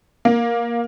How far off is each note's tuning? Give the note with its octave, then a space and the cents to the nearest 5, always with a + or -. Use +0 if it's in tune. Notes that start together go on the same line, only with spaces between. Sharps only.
A#3 +10